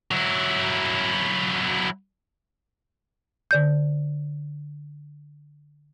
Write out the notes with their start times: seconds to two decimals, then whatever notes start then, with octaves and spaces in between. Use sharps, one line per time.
0.11 F#3 E4
3.51 D3 D5 G6